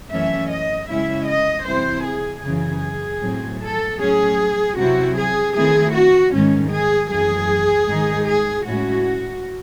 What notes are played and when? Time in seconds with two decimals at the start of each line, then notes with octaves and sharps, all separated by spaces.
0.11 F#2 E3 A3 C#4 E5
0.50 D#5
0.89 C#3 G#3 C#4 E4 E5
1.27 D#5
1.66 C3 E3 C4 E4 C5
2.06 G#4
2.44 F#2 C#3 E3 G#4
3.22 A2 F#3 C4
3.61 A4
4.00 A2 F#3 C#4 G#4
4.78 C3 F#3 C4 E4 F#4
5.17 G#4
5.55 D#3 A3 C4 E4 G#4
5.94 F#4
6.33 G#2 D#3 G#3 C#4
6.71 G#4
7.10 F#2 E3 A3 G#4
7.88 G#2 D#3 G#3 D#4
8.27 G#4
8.66 A2 G#3 C#4 E4 F#4